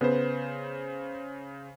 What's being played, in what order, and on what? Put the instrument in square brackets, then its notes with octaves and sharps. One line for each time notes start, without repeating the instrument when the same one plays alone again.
[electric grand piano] C#3 C5 [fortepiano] B3